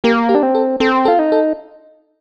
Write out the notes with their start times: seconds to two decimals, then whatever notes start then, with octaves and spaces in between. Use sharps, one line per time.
0.04 A#3 G4 A#4
0.29 G4 A#4
0.35 D4
0.43 C4
0.55 A4
0.80 C4 A4
1.05 A4
1.08 F4
1.19 D#4
1.32 A4